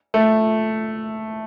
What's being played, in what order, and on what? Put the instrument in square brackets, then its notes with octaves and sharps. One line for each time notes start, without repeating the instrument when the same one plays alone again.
[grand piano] A3